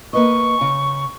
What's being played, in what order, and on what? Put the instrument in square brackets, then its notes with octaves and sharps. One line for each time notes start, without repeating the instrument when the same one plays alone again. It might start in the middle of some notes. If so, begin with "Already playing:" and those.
[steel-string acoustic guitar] A#3 B4 D#5 [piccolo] C#6
[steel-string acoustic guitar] C#3